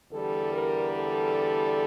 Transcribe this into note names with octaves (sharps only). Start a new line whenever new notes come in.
E2 D3 G3 A4
A#4
A4